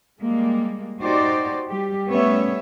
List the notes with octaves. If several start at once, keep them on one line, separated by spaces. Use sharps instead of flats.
G3 G#3 A#3
D#4 F#4 G4 C5 D5
G3 G4
G3 A3 B3 C#4 C#5 E5